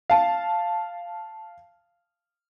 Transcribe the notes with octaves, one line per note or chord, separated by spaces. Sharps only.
F5 A5